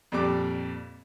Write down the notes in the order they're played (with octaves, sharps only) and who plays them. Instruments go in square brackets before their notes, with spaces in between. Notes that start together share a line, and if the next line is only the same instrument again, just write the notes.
[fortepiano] F2 A#2 G3 D6